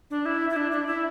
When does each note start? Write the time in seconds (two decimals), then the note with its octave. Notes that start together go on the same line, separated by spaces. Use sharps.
0.10 D4
0.26 E4
0.50 E4
0.56 D4
0.71 D4
0.87 E4